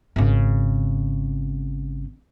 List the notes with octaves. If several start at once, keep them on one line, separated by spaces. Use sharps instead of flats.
G#1 C#3